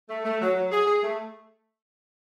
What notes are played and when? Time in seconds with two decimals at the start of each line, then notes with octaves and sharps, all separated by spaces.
0.09 A3
0.25 A3
0.41 F#3
0.56 F#3
0.71 G#4
0.87 G#4
1.03 A3